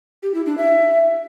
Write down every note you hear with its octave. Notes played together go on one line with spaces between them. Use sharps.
G4
E4
D4
E5